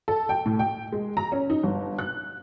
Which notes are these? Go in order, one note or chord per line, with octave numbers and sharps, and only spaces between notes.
A4
G5
A2
G5
G#3
A#5
C#4
D#4
G1
F#6